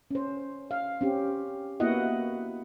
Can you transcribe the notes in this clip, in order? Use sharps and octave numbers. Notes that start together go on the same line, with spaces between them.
C#4 C5
F5
C4 C#4 G4
A#3 B3 E4 F#4 D#5 F#5